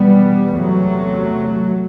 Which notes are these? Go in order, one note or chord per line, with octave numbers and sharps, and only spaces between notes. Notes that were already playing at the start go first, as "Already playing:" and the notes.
Already playing: E2 B2 G3 B3
C3 F#3 A3
E2